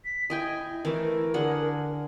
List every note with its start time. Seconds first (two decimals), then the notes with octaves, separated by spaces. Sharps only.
0.05 B6
0.30 E4 D#5 G5 G#5
0.85 E3 A3 E4 A#4
1.34 D3 G#4 F#5